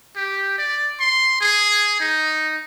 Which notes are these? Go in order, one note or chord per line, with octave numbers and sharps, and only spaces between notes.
G4
D5
C6
G#4
D#4